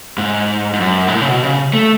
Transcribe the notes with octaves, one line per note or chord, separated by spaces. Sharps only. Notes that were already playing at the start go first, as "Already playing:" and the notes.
G#2
G#2
F#2
G#2
A2
C#3
B2
C#3
A3